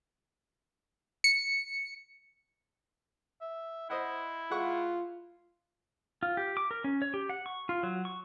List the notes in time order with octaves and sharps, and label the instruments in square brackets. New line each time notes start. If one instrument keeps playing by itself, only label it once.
[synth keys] C#7
[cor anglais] E5
[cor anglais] E4 [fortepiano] C5 D#5 F#5
[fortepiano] G#3 F#5 C#6 [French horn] F4
[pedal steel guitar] F4
G4
D6
A#4
C#4
C#5
G4
F#5
C#6
F4
F#3
C#6